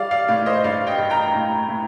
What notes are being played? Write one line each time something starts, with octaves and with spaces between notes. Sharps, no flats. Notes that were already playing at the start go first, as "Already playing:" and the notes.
Already playing: G3 D5 F5
D5 F5
A2 D5 F5
C5 D#5
G2 D5 F5
D#5 G5
G2
G5 A#5
A2
A2